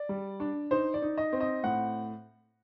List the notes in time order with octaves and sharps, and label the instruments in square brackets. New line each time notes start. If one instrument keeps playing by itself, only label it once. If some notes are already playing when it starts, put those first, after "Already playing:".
Already playing: [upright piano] D5
G3
D4
D#4 C5
D5
D#4
D#5
C4
D#5
A2 F#5